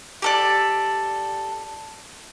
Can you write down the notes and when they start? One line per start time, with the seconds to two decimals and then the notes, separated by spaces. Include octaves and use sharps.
0.22 G4 A4 D5